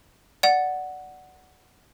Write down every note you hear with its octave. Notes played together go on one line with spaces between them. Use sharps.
D5 F#5